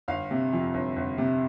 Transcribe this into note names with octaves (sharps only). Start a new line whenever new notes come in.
G1 F5
C3
F2
G1
G1
C3